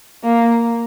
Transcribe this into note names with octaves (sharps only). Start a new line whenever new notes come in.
A#3